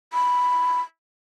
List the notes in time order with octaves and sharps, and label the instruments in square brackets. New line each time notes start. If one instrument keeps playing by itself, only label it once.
[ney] B5